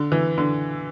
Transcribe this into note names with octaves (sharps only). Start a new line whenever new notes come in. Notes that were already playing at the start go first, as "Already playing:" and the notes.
Already playing: D3
E3
D3